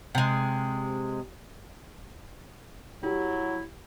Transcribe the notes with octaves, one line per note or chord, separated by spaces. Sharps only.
C3 G#3
F#3 E4 G4